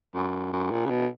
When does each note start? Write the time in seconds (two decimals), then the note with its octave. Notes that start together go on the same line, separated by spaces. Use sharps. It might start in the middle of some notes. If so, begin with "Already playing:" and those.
0.14 F#2
0.52 F#2
0.71 A#2
0.86 C#3
0.90 B2